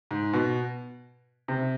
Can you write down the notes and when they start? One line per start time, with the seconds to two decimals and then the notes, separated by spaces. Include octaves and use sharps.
0.11 G#2
0.33 B2
1.48 C3